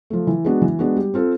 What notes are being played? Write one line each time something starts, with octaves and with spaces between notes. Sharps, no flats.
F3 A3
E3
G#3 B3 D4 F#4
E3
G#3 B3 D4 F#4
G3
C4 F4 A4